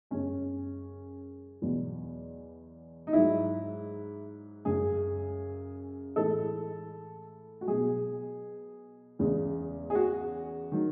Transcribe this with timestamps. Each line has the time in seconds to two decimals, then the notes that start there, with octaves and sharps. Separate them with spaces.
0.11 F#2 C#3 G#3 C#4
1.62 E2 B2 F#3
3.07 D#4
3.13 G#2 F#3 E4
4.65 F#2 C#3 G#3 G#4
6.16 A2 E3 G#3 A4
7.61 F#4
7.67 B2 F#3 G#4
9.19 E2 C#3 G#3
9.90 G#4
9.95 F#4
10.72 D#3 F#3